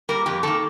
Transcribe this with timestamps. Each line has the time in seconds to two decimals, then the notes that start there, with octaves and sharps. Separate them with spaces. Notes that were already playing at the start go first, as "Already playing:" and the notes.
0.09 G3 A#3 A#4
0.26 F2 G4
0.43 D#3 A#3 A4